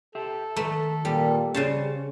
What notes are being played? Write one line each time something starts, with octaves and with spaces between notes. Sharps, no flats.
G4 A4 E5
D#3 A3 B4 A#5
A#2 G3
C#3 G3 C#4 C5 A5